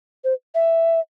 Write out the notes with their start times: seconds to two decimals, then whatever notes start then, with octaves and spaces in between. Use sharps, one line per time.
0.24 C5
0.55 E5